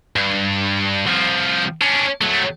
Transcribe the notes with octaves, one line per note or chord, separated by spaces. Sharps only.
G2
C2 F3
C#4 D4
F#3 A3